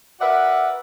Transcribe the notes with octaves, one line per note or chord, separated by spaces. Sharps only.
F#4 A#4 B4 D5 E5 F#5